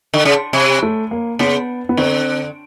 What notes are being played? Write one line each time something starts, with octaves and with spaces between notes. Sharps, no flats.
D3
C#3
C3
A3
A#3
C#3 B3
B3
D3 C4